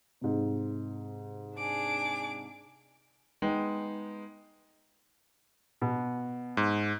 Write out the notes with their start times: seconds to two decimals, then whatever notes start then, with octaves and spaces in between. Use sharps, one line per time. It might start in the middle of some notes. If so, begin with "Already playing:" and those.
0.21 G#2 C3
1.56 D4 G#4 D6
3.42 G#3 B3 D#4 G5
5.82 B2
6.57 G#2